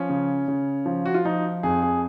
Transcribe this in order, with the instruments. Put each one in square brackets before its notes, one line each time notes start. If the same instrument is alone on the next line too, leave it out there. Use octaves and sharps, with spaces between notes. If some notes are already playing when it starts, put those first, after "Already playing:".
Already playing: [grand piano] F3 C#4
C#3
C#3
F3
F#4
F4
F3 D#4
F2 G#4
G#4